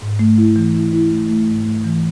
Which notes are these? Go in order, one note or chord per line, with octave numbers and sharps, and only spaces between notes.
G#2
A3
E4
E3
E4
E4
A3
A3
G#2
A3
E3